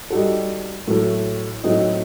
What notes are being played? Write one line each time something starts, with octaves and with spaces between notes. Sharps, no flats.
G3 D#4 F#4 A4
A2 F#3 A3
A2 F#3 A3 C4 D#4